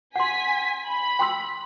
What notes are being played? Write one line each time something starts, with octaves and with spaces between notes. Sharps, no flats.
F#5 G#5 C6 B6
B5
G5 C6 E6